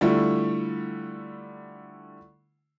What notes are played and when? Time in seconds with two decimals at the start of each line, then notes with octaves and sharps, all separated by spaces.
0.01 D3 G3 A3 E4 F4